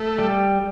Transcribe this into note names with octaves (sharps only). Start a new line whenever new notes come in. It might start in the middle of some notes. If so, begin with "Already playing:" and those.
Already playing: A3
G3